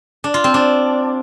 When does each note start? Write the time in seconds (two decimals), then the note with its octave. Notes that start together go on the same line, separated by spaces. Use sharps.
0.24 D4
0.34 F4
0.44 C4
0.54 D4